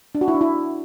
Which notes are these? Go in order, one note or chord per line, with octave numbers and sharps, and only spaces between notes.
D4
F#4
E4
D4
E4